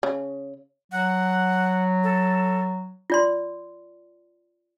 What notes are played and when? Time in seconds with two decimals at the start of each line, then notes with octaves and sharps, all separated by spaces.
0.03 C#3
0.92 F#3 F#5
2.03 A4
3.10 F4 D5 C6